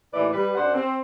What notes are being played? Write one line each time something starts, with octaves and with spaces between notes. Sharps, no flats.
D#2 A2 E3 B4 D5
G3 B4
F#2 D4 C5 F#5
C4